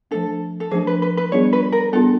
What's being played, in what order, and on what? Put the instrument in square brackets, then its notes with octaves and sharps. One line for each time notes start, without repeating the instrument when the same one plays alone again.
[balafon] F3 A3 D4 [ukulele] A4
[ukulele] A4
[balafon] F3 A3 D4 [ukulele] G#4
[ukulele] B4
B4
B4
[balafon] G3 B3 D4 F4 G#4 [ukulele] C#5
[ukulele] B4
A#4
[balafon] G3 B3 D4 F4 G#4 [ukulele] A4